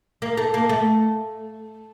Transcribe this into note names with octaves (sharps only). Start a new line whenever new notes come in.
A#3
A3
A#3
A3